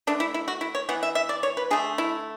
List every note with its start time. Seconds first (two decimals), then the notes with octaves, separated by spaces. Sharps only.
0.07 D3 A3 D4
0.20 E4
0.34 E4
0.48 F#4
0.61 E4
0.75 C#5
0.89 E3 B3 F#5
1.03 E5
1.15 E5
1.29 D5
1.43 C#5
1.57 B4
1.71 D3 A3 G#4
1.98 E4